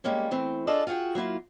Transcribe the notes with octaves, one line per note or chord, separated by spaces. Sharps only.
G3 G#3 A#3 C#4
E3 A3 C4
D4 F4 G#4 A4 D5 D#5
F4 F#4 G#4 F#5 G5
F#3 A#3 E4 F4